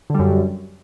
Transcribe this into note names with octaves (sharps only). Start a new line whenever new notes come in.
F#2 D3 G3